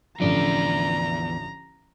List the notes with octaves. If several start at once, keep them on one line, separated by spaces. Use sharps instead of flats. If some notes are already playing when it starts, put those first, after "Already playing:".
A1 E2 D3 F3 D5 A#5